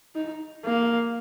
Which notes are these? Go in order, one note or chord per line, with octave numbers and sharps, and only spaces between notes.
D#4
A#3